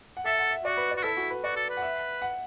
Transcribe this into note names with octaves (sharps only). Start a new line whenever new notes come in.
F#5
A4 E5
F#5
E5
F#4 D5
B4
D5
F#4
E4 A4
F#4
B4
F#4 D5
A4
B4
F#5
E5
F#5